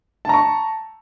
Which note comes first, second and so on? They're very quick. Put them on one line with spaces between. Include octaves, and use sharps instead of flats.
A5 A#5 C#6